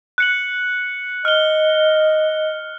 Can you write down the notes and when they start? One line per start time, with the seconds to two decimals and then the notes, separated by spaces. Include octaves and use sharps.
0.18 F#6 C#7 F#7
1.25 D#5 F6 G7